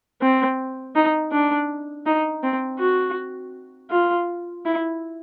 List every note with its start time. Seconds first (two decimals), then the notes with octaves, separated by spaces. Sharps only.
0.21 C4
0.96 D#4
1.32 D4
2.06 D#4
2.43 C4
2.79 F#4
3.91 F4
4.65 E4